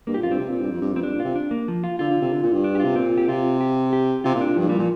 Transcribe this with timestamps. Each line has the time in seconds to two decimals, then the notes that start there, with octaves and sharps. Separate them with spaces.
0.07 G2 A#3
0.14 A#2 G4
0.23 F2 F4
0.28 G2 C4
0.39 C3
0.49 A#2
0.61 G2
0.71 F2
0.81 G2
0.92 F2 C4
1.03 G2 D4
1.14 A#2
1.20 C3 F4
1.35 D4
1.51 A#3
1.68 F3
1.84 F4
1.99 D3 F4
2.10 D3
2.21 C3
2.32 D3
2.43 A#2
2.53 G2
2.64 D4
2.75 G4
2.80 C3 F4
2.96 A#2 C4
3.18 G4
3.28 C3 F4
3.61 G4
3.93 G4
4.24 C3 F4
4.35 A#2
4.41 D4
4.46 A#2
4.56 G2 F3
4.68 A#2 G3
4.79 A#2 F3